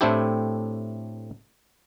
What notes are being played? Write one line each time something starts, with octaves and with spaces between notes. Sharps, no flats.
A2 A3 C4 D4 E4 G4